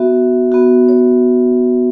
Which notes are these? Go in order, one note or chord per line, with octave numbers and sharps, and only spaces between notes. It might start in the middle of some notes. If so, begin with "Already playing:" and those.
Already playing: B3 F#4 E5
B3 F#4
C#5